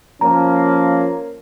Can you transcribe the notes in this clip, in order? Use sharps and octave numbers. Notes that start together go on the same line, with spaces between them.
F3 A#3 C#4 A#5